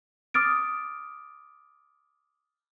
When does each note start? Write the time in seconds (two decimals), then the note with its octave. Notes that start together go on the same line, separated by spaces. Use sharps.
0.34 D6 D#6 F6 A6 D7